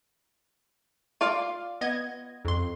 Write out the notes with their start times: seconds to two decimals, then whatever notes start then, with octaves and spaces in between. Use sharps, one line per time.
1.21 F4 D5 F5
1.81 B3 D#5 G#6
2.45 F2 C6